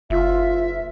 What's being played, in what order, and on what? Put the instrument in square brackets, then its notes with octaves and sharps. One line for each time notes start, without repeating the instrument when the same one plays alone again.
[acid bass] F#1 [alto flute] F4 [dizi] E5